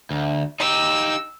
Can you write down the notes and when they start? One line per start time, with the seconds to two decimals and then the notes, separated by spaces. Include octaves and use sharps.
0.11 D2
0.60 D#4 G4 E6